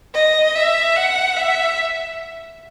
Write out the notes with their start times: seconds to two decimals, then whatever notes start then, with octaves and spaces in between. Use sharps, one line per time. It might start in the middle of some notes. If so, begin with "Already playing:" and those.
0.14 D#5
0.55 E5
0.96 F#5
1.37 E5